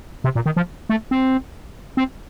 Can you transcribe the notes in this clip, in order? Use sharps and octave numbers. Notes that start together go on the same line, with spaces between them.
C3
A#2
D#3
F3
A3
C4
C4